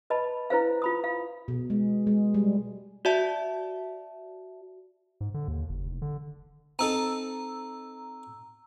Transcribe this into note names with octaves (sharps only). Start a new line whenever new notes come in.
B4 D#5 A5 B5
E4 B4 C5 F5
F4 B5 D#6
F5
B2
G#3
G#3
G3
F#4 D5 E5 A5
G#2
D3
D#2
F#1
F1
D3
C4 D#4 A4 A#5 E6